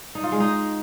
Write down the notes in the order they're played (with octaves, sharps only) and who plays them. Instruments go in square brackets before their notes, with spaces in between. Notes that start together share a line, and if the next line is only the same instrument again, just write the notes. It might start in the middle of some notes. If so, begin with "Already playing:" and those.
[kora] D#4
F4
G#3
D#4